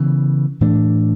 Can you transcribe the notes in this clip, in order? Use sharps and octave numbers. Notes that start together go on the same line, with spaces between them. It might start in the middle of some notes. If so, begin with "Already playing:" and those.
Already playing: C#3 E3 B3
A2 E3 A3 D4